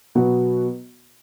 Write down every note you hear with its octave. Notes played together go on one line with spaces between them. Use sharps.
B2 F#3 B3 F#4